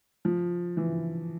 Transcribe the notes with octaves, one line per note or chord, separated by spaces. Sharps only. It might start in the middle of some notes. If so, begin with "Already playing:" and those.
F3
E3